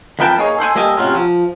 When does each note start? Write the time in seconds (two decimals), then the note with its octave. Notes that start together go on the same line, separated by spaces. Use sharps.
0.19 F2 E3 B3 A#4 G5 A5
0.37 A#3 D#4 G#4 C#5
0.59 A4 C5 F#5 G#5
0.75 G3 A#3 A4 D#5 G#5
0.97 A2 C3 D#3 F#3 C#4 F4
1.15 F3